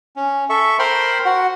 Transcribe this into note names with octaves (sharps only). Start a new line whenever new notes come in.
C#4
A4 E5 C#6
A#4 C5 G5 B5 C6
F#4 F#5